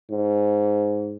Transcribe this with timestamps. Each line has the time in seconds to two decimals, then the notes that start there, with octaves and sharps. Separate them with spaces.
0.11 G#2